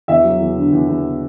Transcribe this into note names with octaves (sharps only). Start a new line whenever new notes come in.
E2 E5
F#3
E2
D3
E2
E2